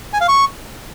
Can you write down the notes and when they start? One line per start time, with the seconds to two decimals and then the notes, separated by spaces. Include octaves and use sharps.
0.13 G#5
0.21 F5
0.28 C#6